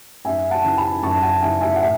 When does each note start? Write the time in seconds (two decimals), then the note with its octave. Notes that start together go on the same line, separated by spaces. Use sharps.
0.25 F#2 E5 G#5
0.51 F#5 A5
0.64 C#3 E3
0.77 G#5 B5
1.02 F#2 A5 C#6
1.22 F#5 A5
1.41 C#3 E3 E5 G#5
1.61 E5 G#5
1.76 F#5
1.80 A2 E5 G#5